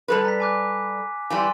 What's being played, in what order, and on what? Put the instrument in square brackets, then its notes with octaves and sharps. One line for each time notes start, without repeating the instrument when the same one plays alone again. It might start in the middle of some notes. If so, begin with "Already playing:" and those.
[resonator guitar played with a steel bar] G3 A4 B4
[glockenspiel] A#5 B6
G#5 D6 F#6
[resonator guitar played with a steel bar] E3 G3 E4 [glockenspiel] G#5 C6